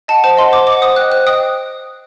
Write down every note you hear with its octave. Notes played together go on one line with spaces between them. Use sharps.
D#5 F#5 A5
C5 A5
D#5 F#5 C6
C5 D6
D#5 F#5 D6
C5 D#6
D#5 G5 F#6
C5 F#6
D#5 G5 D#6